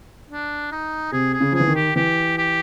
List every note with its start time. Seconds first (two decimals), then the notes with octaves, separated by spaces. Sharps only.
0.30 D4
0.71 D#4
1.12 C3 G#4
1.33 G#4
1.40 C#3
1.52 F3 G#4
1.60 E3
1.67 D#3
1.75 G4
1.96 E3 G4
2.38 G4